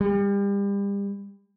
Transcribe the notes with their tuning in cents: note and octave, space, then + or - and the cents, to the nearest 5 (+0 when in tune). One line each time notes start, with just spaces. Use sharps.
G3 +35